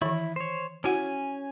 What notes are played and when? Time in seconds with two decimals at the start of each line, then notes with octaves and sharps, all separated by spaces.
0.02 D#3 E3 E4
0.36 C5 C#5
0.84 C#4 E4 F#4 F#5 G#5